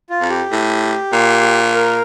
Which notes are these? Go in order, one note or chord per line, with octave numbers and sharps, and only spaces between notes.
F4
F2
G4
A2
A#2
A#4